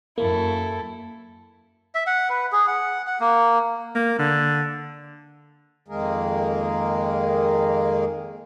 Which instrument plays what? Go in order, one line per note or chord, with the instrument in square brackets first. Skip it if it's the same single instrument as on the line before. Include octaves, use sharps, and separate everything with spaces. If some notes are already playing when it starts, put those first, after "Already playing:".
[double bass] F#2 [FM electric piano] A#3 [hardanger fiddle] E4 A4
[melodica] E5
F#5
B4
G#4
F#5
F#5
A#3
[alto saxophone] A#3
D3
[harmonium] F2 D#3 G#3 A#3 G#4 A#4